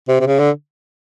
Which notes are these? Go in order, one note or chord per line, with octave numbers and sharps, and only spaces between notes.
C3
C3
C#3
D3